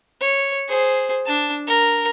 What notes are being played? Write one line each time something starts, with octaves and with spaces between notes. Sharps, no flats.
C#5
G#4 C5
D4 A5
A#4